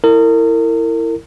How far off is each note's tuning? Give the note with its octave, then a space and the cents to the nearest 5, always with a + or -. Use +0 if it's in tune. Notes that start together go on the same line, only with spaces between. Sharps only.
E4 +0 A#4 -35